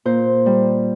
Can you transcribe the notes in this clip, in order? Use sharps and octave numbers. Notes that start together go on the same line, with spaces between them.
A#2 C5
G3